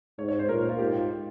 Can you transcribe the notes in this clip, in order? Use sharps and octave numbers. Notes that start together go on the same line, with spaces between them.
G#2 C#5
C#5
C5
A#2 A#4
F4
G#2 G4
F4